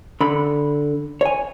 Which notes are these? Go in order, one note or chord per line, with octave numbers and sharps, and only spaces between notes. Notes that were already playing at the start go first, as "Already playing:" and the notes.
D3 B5
C#5 G#5